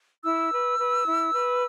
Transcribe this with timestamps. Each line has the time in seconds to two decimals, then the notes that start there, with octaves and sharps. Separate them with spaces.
0.24 E4 E6
0.51 B4
0.78 B4
1.05 E4
1.33 B4